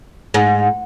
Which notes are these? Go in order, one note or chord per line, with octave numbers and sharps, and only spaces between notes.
G#2